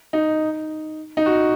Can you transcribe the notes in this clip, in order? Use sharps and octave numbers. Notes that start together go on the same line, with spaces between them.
D#4
D#4
F#4